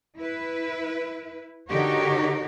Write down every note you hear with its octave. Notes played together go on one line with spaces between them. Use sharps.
E4 B4
D3 D#4 F#4 G4 A#4 C#5